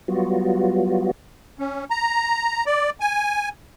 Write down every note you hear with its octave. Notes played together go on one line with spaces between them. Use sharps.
F#3 G3 B3 F4 F#4
C#4
A#5
D5
G#5